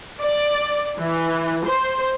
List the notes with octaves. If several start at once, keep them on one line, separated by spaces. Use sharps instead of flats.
D5
E3
C5